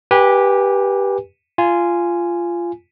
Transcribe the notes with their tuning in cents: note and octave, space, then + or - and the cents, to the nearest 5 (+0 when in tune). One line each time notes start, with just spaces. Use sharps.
G4 +0 B4 -20 G#5 -25
F4 -15 G#5 +0